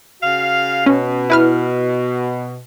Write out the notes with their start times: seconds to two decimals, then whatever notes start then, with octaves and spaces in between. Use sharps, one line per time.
0.22 C#3 F#4 F5
0.86 B2 C#4
1.30 E4 B4 F6